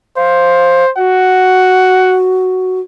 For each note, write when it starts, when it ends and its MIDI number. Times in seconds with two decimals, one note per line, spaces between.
0.17 0.91 72
0.17 0.85 77
0.97 2.80 66
0.97 2.19 78